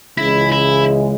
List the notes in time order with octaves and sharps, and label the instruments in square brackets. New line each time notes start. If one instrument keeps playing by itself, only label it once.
[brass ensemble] C#2 C#3 E3 G#3 [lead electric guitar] E4
[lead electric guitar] E4